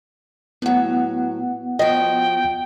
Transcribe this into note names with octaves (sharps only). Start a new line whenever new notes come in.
A2 F#3 B3 F#5
F3 F#4 D#5 G5